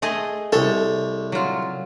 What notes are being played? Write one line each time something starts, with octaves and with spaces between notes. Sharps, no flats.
A3 G#4 D#5
C2 A4 C#5
F#3 F4